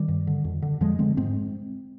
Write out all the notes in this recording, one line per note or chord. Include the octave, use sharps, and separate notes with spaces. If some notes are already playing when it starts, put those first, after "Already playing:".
Already playing: D#3 G3
G2
D3
F2
D3
F2 F3 G#3
D3 G#3 C4
G#2 G#3 C4